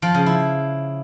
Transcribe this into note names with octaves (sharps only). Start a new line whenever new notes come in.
F3
C#3
E4